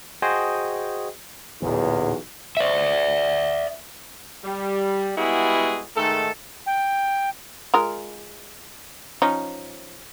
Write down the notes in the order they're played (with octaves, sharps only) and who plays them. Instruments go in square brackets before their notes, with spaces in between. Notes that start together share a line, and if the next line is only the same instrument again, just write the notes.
[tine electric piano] F#4 G#4 C5 D#5 G5 G#5
[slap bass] D1 A#2 E3 [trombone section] B1 E2
[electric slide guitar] D5 E5
[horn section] G3
G3 G#3 B3 E4 F#4 G#4
G#2 D#3 A3 A4
[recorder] G5
[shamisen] G#3 F4 A#4
F3 C#4 D#4